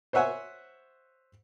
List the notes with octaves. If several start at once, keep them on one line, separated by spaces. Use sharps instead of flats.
C5 C#5 E5 F#5 G#5